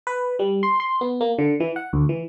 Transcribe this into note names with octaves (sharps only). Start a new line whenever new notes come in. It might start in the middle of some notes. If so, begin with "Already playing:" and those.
B4
G3
C6
C6
B3
A#3
D3
E3
F#5
D2
E3